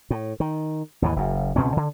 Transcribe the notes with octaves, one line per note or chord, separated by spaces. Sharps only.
A2
D#3
D#2 G#2 E3
F#1 F#2
C#2 B2 C4 C#4
D3